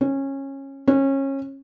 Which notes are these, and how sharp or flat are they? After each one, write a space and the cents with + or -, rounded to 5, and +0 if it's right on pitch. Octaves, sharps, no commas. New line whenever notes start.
C#4 -20
C#4 -25